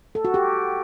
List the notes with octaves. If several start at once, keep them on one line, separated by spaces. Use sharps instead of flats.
A4
F#4
G4